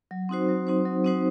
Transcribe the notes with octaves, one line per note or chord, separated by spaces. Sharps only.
F#3
C4 D#4 F#4 C5
F#3
C4 D#4 F#4 C5
F#3
C4 D#4 F#4 C5